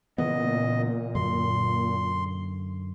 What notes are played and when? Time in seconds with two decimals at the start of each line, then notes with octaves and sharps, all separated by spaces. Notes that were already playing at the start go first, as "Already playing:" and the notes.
0.18 A#2 C#3 E3 B3 D#5
1.15 F#2 D3 C6